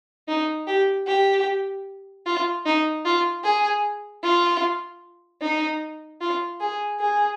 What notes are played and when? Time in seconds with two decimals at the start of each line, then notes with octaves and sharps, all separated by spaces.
0.28 D#4
0.68 G4
1.07 G4
2.26 F4
2.66 D#4
3.05 F4
3.44 G#4
4.24 F4
5.42 D#4
6.21 F4
6.61 G#4
7.00 G#4